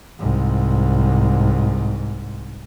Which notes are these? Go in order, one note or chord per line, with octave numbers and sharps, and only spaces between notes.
C2 G#2